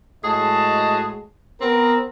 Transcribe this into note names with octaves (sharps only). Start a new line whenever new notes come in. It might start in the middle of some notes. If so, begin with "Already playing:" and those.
A2 G#3 F#4 G#4 D#5 A5
B3 C4 A#4